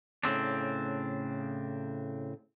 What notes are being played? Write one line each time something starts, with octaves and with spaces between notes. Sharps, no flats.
A2 C#3 C4 D4